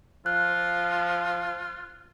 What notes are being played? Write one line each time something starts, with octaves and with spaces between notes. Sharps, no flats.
F3 F4 F#6